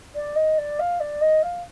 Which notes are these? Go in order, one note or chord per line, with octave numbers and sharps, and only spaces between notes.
D5
D#5
D5
F5
D5
D#5
F5